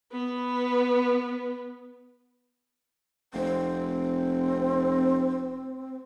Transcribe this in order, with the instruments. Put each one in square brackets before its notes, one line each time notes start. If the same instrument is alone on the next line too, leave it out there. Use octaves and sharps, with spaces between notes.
[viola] B3 B4
[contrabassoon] F1 [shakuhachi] C4